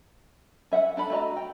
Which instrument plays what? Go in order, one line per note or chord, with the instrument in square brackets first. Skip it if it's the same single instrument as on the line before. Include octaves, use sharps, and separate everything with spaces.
[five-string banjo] C#4 E5 F#5
D4 A4 B5
A3 F#4 D#5 A#5
G5